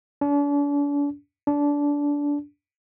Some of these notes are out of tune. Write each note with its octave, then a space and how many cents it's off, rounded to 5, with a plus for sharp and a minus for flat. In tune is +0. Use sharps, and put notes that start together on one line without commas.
D4 -40
D4 -20